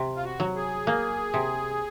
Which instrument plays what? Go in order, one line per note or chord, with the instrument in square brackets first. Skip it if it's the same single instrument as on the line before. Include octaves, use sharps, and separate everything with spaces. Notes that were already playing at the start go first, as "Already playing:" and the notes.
Already playing: [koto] C3
[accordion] F4
F#4
[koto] F#3
[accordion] G#4
[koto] A#3
C3